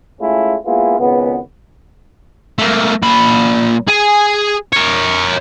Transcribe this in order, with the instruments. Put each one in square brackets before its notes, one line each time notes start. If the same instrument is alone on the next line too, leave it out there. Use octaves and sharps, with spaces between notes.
[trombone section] G#3 A3 C#4 E4 F4
G#3 A#3 B3 E4 F4
G#1 C#2 B3
[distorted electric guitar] A3 A#3
A#2 B5
G#4 G#5
A#4 C#5